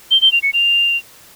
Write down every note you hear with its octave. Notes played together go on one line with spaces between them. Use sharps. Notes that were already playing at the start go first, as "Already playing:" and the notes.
G7
G7
F7
C#7
F7